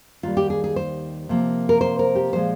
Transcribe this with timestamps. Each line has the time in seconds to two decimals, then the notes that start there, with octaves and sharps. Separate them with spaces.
0.23 D#2 D#3 G3 F4
0.37 G4
0.50 G#4
0.64 G#4
0.76 C5
1.29 C3 F3 A#3
1.69 A#4
1.81 C5
1.99 A#4
2.15 G4
2.33 A#2 F3 G#3 C5